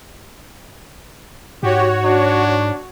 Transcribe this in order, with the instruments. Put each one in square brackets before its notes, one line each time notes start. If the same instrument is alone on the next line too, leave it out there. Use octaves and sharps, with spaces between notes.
[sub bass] G#2 [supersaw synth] F#4 C#5 [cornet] G4
[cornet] D4